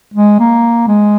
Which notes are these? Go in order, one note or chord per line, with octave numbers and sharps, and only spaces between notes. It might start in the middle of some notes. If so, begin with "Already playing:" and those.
G#3
A#3
G#3